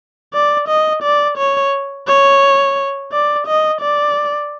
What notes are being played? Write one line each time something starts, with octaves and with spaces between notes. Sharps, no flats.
D5
D#5
D5
C#5
C#5
D5
D#5
D5